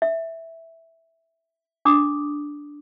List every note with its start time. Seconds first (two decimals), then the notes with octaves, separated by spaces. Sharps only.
0.02 E5
1.85 D4 D6 D#6